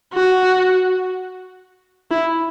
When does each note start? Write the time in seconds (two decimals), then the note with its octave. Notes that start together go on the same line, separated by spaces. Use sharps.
0.14 F#4
2.11 E4